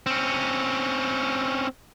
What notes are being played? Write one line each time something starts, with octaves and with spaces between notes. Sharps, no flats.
C4 C#4